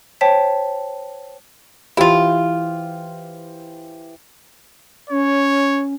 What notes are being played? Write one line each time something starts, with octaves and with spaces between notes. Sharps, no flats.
C5 C#5 G5 A5 B6
E3 E4 F4 G4 C5
C#4 C#5